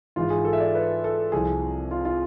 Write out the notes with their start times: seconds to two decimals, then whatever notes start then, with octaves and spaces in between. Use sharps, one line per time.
0.16 G#2 E3 G#3 F4
0.30 G#4
0.45 A4
0.53 E5
0.60 D5
0.75 B4
1.04 A4
1.32 C2 C3 F3 G#4
1.91 F4
2.05 F4